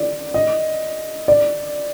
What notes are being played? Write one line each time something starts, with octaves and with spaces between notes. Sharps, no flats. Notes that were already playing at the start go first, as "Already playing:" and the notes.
Already playing: D5
D#5
D5